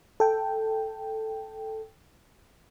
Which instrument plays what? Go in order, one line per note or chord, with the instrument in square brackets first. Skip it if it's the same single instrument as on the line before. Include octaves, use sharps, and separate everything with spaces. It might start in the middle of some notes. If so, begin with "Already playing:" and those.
[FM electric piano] A4 G5